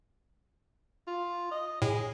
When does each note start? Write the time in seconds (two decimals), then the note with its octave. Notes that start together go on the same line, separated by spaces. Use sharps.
1.07 F4
1.51 D#5
1.82 A2 G#4